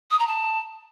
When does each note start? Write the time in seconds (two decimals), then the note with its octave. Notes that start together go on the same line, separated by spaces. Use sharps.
0.11 D#6
0.19 A#5
0.28 A5